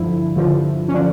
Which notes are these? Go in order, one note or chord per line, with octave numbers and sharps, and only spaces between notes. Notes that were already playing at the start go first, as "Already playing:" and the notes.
Already playing: G2 D3 F3 E4
G2 D3 F3
C#4
D3 F3 D4